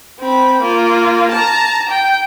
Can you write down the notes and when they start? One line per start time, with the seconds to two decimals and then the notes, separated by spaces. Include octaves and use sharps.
0.20 C4 B5
0.62 A#3 F4
1.32 A5 A#5
1.89 G5